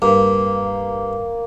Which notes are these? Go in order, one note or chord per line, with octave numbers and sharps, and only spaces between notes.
G2 A#3